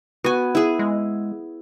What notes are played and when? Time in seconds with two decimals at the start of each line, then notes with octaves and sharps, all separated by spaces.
0.24 B3 F#4 G#5
0.55 E4 G#4
0.79 G#3